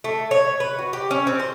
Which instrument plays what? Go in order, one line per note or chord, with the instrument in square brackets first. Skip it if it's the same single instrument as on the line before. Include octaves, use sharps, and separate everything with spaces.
[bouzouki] A3
C#5
B4
F#4
G4
C#4
C4
C5